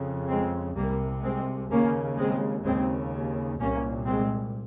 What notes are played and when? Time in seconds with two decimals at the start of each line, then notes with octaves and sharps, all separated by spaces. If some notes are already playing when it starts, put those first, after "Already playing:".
Already playing: F2 C#3
0.28 G#3 C4
0.76 C2 C3 G3 A#3
1.23 G#3 C4
1.70 D#2 C#3 A#3 C#4
2.18 G#3 C4
2.65 D#2 C#3 G#3 C4
3.59 C2 A#2 A#3 C#4
4.07 G#3 C4